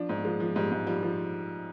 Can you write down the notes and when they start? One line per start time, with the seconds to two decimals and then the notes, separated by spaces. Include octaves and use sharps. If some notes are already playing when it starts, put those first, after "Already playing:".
Already playing: F3 D4
0.09 G#2
0.25 F3 G#3
0.40 F3
0.55 G#2 G3
0.71 G#2
0.87 F3 G3
1.02 F3